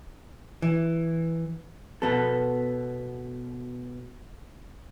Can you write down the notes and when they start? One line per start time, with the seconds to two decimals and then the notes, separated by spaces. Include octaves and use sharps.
0.62 E3
2.02 B2 B3 A4